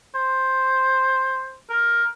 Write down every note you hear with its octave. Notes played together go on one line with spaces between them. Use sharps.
C5
A#4